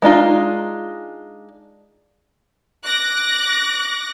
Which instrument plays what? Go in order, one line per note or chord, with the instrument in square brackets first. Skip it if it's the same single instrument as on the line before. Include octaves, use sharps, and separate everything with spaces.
[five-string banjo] G#3 D4 D#4 F4
[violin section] D6 F#6 A#6